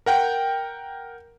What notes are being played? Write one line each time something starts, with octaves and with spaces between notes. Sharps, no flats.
A#4 F#5 G5